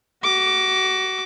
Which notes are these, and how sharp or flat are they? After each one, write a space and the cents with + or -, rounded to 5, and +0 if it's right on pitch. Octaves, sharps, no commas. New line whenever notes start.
F#4 +25 D6 +0